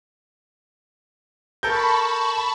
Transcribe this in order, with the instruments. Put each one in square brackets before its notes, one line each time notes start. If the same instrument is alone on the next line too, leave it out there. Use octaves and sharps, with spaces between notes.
[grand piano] A4 A#4 G6 [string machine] A5 B5 C#6